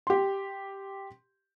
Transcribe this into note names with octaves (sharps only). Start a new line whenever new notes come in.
G4 C6